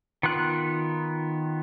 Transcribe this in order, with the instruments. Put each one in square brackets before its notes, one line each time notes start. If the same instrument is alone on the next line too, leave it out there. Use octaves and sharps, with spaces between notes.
[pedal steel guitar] D#3 B3 F4 F#6